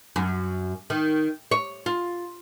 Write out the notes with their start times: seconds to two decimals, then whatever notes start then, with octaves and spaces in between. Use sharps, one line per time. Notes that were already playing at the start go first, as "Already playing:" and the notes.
0.16 F#2
0.90 D#3
1.51 C#5
1.86 F4